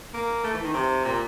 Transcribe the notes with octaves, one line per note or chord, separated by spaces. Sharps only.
A#3
A3
E3
D#3
C3
A#2